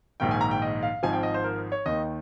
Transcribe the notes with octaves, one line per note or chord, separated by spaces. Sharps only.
A#1 G#2 D#3 G5
G#5
A#5
G5
D#5
F5
G#1 G#2 F3 G#5
G5
D#5
C5
A#4
C#5
D#2 D#3 D#5